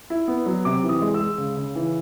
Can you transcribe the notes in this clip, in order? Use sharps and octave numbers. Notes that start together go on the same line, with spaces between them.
E4
B3
F#3
C3 D6
E3
D#6
G#3
E6
G#3
C#3
C#3
E3